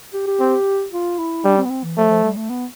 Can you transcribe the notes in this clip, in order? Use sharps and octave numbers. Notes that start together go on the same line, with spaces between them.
G4
G4
C4
F4
E4
G3 D4
C4
B3
C4
E3
F3 A3
F3
G3
A3
B3